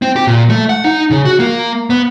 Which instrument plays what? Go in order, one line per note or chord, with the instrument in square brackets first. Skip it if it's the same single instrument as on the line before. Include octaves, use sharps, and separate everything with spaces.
[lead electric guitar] C4
G4
A#2
A3
F#5
D#4
C#3
F#4
A#3
B3